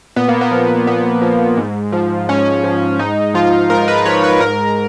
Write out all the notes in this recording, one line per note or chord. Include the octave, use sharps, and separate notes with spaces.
A#2 B3
A#3
B3
F3
A#2 B3
F3
G#2
F3
G#2 C#4
F3
G#2 D#4
F3 F4
G#2 A#4
B4
F3 C#5
B4
G#2 A#4